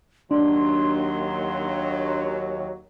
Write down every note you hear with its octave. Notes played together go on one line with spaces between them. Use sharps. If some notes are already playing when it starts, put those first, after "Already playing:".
D#2 F#3 D4 C6